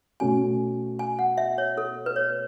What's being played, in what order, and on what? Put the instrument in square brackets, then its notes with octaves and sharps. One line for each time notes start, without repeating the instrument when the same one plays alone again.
[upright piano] B2 A3 C#4 F#4 [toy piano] G#5
[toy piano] G#5
F#5
E5
C#5
A4
B4
C#5